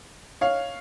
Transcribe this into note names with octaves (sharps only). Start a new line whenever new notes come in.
C#5 F5